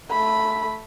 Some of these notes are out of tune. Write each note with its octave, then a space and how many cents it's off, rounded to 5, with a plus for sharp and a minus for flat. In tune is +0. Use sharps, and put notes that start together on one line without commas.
A3 +0 B5 +0